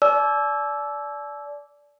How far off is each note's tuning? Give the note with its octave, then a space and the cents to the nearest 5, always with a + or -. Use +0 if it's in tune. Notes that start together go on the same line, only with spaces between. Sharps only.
D5 -15 A5 -45 E6 +0